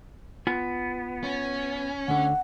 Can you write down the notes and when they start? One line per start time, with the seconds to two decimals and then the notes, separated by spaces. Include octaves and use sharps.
0.47 B3 F4 G#5
1.24 C#4
2.08 D2 D3 F#5